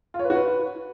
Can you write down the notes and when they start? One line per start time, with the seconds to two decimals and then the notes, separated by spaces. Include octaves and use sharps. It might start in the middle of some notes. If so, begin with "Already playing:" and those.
0.14 F4
0.19 C#5
0.25 B4
0.30 F#4
0.35 B4